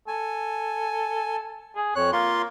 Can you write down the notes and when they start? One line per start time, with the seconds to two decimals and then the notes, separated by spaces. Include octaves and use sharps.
0.08 A4 G#5
1.76 G#4
1.95 F2 C#5 F#6
2.13 A#3 F4 C6